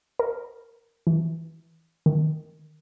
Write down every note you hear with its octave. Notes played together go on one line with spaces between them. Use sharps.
A#4
E3
D#3